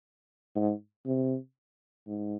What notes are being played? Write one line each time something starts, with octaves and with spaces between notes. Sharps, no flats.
G#2
C3
G#2